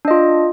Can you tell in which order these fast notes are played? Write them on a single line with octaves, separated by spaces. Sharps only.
D4 D#5 F4